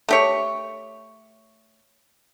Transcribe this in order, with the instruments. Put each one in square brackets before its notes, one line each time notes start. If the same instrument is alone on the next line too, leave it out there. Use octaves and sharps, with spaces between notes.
[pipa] A3 G4 C#5